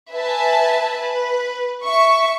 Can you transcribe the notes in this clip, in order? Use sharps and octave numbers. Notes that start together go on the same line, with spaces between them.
B4 E5 G#5 A5
B4
E5 C#6